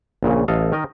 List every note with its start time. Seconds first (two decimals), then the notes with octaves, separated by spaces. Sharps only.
0.23 A#1 A#2 C#3
0.48 A1 A4 D#5 F5
0.72 D#3 A#4 D#5